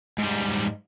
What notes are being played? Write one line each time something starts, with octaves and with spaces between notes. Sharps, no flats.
G#2 G3